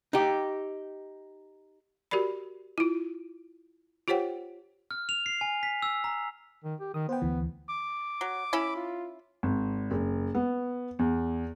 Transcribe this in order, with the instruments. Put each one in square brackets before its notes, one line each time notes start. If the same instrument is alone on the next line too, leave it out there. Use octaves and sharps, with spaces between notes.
[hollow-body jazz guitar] D#4 G4
[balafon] F#4 G4 A#4 D5 B5
E4 F4
F4 G4 C5 C#5 F#5 G5
[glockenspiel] F6
F7
C7
G#5
B6
E6
A#5
[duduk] D#3
G4
[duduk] D#3 [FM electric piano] D#6
[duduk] B3 [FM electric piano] C5 G5
[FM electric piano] D2 E3
[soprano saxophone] D6
[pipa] F#3
C#4 E4 B5
[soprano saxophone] F4
[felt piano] G#1
F#1
B3
E2